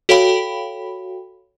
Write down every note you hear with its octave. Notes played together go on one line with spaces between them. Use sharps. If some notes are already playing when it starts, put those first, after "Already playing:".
F#4 A4 C#5 F5 G5 B5